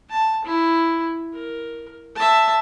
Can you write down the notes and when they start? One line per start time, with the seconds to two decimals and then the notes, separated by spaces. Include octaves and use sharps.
0.10 A5
0.45 E4
1.34 A#4
2.15 E5 A5